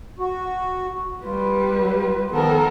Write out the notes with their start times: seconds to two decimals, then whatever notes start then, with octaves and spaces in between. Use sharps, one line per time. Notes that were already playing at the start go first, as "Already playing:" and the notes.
0.19 F#4
1.24 G3 F4 B4
2.31 D#3 F3 B3 A4 A#4